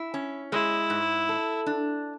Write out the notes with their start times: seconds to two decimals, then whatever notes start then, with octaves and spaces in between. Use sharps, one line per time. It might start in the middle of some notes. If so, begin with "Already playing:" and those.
Already playing: E4
0.14 C#4
0.52 G#3 E4
0.90 G#2
1.29 A4
1.66 D4